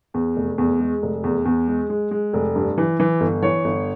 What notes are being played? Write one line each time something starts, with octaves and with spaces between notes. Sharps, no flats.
E2
F1
E2
G#3
F1
E2
E2
G#3
G#3
G#3
F1
G2
E3
E3
G1
E3 C#5
G1